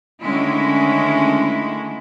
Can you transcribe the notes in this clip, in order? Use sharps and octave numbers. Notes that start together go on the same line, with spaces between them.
D3 D#3 G#3 A3 C#4 E4